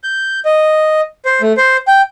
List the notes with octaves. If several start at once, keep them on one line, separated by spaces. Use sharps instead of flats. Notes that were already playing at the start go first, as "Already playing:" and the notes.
G6
D#5
C5
A3
C5
G5